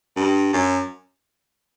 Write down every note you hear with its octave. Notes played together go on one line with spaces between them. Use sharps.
G2
F#2